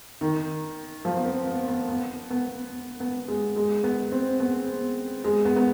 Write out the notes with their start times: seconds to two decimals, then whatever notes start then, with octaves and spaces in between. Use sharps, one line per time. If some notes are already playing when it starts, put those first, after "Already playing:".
0.21 D#3
1.05 F3
1.17 B3
1.26 C4
1.47 B3
1.68 B3
1.88 B3
2.30 B3
3.00 B3
3.28 G#3
3.56 G#3
3.84 B3
4.12 C4
4.40 B3
5.24 G#3
5.45 B3
5.56 B3